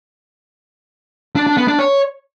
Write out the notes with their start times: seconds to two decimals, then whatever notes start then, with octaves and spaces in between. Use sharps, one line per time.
1.36 D4
1.47 D4
1.57 B3
1.68 D4
1.79 C#5